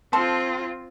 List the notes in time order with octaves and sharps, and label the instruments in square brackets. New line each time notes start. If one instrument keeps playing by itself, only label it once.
[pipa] F3 A4 C5 [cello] C4 F4